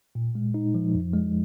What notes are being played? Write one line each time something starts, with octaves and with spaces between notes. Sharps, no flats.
A#2
G#3
D#4
F3
F2
G#3